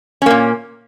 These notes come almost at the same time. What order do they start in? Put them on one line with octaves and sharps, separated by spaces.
C#4 A#3 A#2